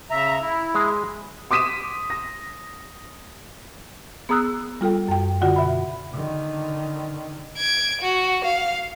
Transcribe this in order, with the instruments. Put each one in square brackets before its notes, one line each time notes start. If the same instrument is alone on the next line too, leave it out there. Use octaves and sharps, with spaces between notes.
[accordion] C#3 E5 A#5
E4
[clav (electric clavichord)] G#3 G#4 A#5
[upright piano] C6 D6 D#6 B6 D#7 E7
A#6
[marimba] B3 G#4 A#5 D#6 E6 F#6
G3 F4 A4 G5
F#2 G5
D3 F4 F#4 F#5
B2 E5 B5
[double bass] D3 D#3
[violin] G#6 D7
F#4
F5